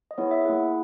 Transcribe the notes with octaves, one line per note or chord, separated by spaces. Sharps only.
D#5
B3 E4 G#4 C#5
E5
A#3 E4 G#4 F#5